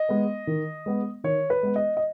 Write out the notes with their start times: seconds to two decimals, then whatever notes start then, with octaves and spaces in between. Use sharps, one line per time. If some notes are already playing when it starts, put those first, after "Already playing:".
Already playing: D#5
0.09 G#3 B3
0.47 D#3
0.86 G#3 B3
1.24 D#3 C#5
1.50 B4
1.63 G#3 B3
1.76 D#5
1.97 D#5